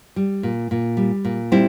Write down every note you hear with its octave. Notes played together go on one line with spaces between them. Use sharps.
G3
A#2
A#2
G3
A#2
G3 C4 E4